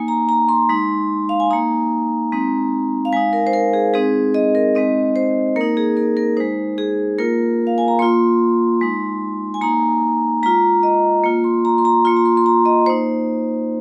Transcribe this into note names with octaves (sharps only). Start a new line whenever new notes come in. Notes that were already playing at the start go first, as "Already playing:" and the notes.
Already playing: A#3 D#4 G#5
A#5
A#5
C6
G#3 D#4
F5
G#5
A#3 D#4 A#5
G#3 C4 D#4
F5
G#3 D#4 G#5
A#4
C5
A#4
G#4
G#3 C4 D#4 G#4
D#5
A#4
G#3 C4 D#4 D#5
C5
A#3 D#4 A#4
G#4
A#4
A#4
G#3 D#4 C5
G#4
A#3 F4 A#4
F5
G#5
A#5
A#3 F4 C6
G#3 D#4
G#5
A#3 D#4 A#5
G#3 F4 A#5
D#5
A#3 F4
C6
A#5
C6
A#5
A#3 F4 C6
A#5
C6
C6
A#5
D#5
A#3 D#4 C5